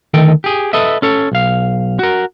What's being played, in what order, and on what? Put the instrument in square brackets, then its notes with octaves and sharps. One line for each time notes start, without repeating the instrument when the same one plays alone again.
[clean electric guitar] D2 D#3 A4 D#5 G5
G4 G#4
A4 B4 D#5 E5
C#4 A4 C#5
B1 F5
F#4 A#4